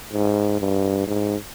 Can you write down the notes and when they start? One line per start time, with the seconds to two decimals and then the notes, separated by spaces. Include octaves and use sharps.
0.13 G#2
0.60 G2
1.08 G#2